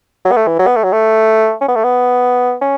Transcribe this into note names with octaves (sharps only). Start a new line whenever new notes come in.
F#3
B3
A3
E3
F#3
B3
A3
F#3
A3
C#4
B3
A3
B3
C#4